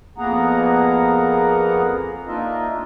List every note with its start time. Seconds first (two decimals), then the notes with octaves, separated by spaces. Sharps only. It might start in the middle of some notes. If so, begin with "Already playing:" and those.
0.18 F2 A#3 B3 G#4 F#5 A#5
2.27 A#3 D4 D#4 F4 D#5 E5